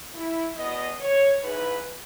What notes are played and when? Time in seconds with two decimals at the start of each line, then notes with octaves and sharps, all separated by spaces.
0.14 E4
0.57 E2 B2 D#5
0.99 C#5
1.42 G#2 E3 B4